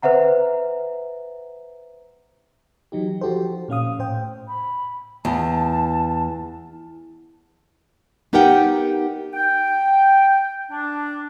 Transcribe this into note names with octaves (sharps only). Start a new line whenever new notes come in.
B4 C5 E5 F#5 A#5
E3 F#3 D#4 G4
F3 F#4 G4 A4 C5
A#2 C#4 F5 D#6
A2 C5 G5
B5
E2 A5
B3 D#4 G4 A#4 F#5 G5
G5
D4